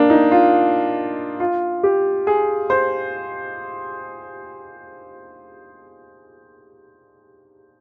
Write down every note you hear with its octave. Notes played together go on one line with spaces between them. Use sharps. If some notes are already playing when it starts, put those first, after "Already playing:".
Already playing: A#3 D4
D#4
F4
F4
G4
G#4
C5